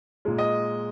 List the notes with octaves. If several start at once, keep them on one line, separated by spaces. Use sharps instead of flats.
A#2 G#3
D#5